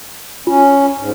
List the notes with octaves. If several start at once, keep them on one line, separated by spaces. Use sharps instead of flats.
C#4 F4
G#2